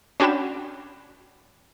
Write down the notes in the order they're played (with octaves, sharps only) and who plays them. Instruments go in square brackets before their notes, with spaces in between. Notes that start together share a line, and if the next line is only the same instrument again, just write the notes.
[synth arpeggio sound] C#4 D4 F#4 G5 B5 E7